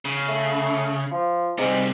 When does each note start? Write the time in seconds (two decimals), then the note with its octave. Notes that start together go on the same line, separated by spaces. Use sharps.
0.05 C#3
0.28 A3
1.11 F3
1.58 G#2 C3 G3